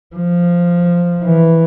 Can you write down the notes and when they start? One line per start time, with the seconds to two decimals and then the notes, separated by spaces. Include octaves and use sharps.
0.16 F3
1.24 E3